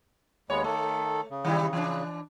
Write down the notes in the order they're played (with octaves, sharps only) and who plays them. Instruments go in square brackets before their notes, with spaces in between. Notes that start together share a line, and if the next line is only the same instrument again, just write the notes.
[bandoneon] D#2 G#3 B3 [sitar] C#5
[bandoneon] D#3 A4 [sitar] A3
[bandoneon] C#3
[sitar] D#3 G3 E4
E3 D4